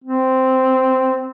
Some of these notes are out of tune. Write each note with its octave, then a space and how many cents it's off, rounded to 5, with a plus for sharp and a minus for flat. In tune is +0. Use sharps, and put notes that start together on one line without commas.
C4 -5